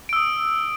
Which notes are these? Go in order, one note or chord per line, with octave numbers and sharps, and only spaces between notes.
D#6 E6 D7